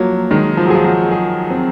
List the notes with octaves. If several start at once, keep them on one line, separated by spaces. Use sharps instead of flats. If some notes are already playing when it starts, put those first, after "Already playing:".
Already playing: F3 F#3 A#3
D#3 G#3
F3
F#3
F3 G#4
F#3
G#4
C4